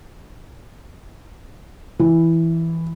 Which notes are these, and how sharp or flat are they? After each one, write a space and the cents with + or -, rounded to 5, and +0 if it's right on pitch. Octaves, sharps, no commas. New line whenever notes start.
E3 +0